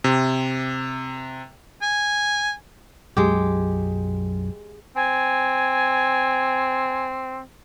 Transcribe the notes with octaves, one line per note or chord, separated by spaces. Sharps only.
C3
G#5
B1 F#2 F#3 G#3 G4
C4 G#5